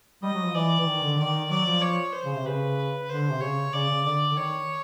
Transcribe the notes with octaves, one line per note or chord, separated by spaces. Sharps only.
G3 D#5
F#3
F3
E3 D5
E3
D#3
D3
D#3 D5
F#3 D5
F3
C#5
C5
C#3
C3
C#3 B4
D3 C5
C3
C#3 C#5
C#3 D5
C#3
D3 D5
D3
D#3 C#5